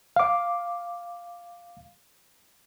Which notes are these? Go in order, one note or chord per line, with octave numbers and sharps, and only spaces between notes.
F5 D6